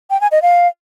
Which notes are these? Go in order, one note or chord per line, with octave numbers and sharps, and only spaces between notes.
G5
G#5
D#5
F5